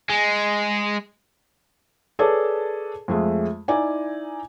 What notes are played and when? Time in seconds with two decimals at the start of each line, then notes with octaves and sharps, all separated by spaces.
0.09 G#3
2.19 G#4 A4 B4 C#5 D5 A5
3.08 F2 G#3 A3
3.68 D#4 E4 D5 G#5